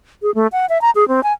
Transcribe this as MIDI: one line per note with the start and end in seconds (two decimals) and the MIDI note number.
0.22 0.34 68
0.35 0.47 57
0.52 0.66 78
0.69 0.81 76
0.82 0.90 82
0.95 1.08 68
1.08 1.23 60
1.23 1.33 80